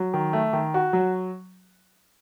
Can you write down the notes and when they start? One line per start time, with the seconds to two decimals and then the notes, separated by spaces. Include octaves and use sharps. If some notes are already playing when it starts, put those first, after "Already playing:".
Already playing: F#3
0.14 D#3
0.33 A3
0.53 D#3
0.74 F#4
0.93 F#3